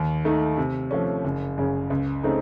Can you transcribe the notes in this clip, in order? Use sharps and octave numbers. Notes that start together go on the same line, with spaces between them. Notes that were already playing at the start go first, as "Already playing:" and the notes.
Already playing: D#2
D#3 A3 D#4
C3
F3 A3 C#4
F#1
F#2 C#3
C#2
C#3 A3 C4 D#4